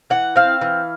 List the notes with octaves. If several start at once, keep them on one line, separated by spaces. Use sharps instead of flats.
E3 F#5
C4 F5
E3